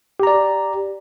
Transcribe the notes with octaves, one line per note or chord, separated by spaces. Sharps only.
G4 D5 A#5